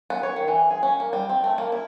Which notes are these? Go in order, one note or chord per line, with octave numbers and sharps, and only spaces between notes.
B3
C#5
D#3
E3
G#4
C#4
A#3
G3
C4
A3
A#3
E4